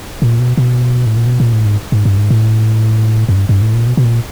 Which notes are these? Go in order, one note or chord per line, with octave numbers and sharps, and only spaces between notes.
A#2
B2
B2
A2
A#2
B2
A#2
A2
G#2
G#2
G2
G#2
A2
F#2
G2
G2
A2
A#2
B2
B2
A#2